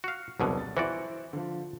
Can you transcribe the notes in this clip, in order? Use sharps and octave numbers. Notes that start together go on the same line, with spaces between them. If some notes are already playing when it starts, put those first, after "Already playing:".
F#4 F5
E1 C2 B2 D3 F#3
A6
E3 E4 F#4 C5 D5
D3 F3